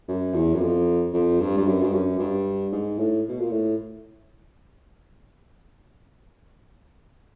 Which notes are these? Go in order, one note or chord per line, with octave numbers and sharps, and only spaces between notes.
F#2
E2
F#2
F2
F2
G2
G2
F#2
G2
F#2
G2
G#2
A2
B2
A#2
A2